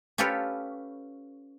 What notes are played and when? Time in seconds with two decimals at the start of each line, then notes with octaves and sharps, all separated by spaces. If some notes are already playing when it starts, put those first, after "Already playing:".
0.18 C#4 F4 G4 A4 B4 C#5